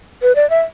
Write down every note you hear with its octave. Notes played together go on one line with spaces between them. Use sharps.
B4
D5
E5